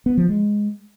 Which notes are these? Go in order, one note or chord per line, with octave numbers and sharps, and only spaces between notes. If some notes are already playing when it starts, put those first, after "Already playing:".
B3
F3
G#3